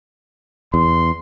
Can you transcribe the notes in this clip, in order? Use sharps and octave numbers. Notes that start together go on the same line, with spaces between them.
E2 C6